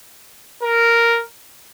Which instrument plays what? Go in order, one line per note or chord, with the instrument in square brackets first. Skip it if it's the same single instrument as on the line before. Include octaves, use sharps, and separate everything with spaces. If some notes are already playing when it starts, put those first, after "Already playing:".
[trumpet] A#4